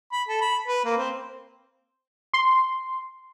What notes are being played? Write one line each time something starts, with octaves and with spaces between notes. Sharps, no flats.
B5
A4
B5
B4
A#3
C4
C6